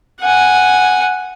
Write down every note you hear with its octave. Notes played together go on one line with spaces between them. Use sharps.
F#5 G#5